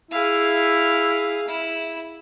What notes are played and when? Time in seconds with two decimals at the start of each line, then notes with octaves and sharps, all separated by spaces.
0.11 E4 G#4 F5
1.47 E4